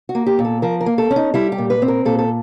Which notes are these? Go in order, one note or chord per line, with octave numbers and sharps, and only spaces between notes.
F#4
A#3
G4
A#2
A4
F3 A#4
A#4
A#3
A4
C#4
D#4
G3 E4
G4
A#2
B4
C4
A#4
A#2 A4
A4